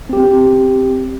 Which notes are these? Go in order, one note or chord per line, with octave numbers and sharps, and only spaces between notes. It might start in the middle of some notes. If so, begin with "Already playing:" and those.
C4 G4